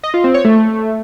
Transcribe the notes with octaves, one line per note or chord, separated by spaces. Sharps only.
D#5
F4
C4
C#5
A3